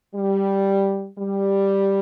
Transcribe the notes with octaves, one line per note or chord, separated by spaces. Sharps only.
G3
G3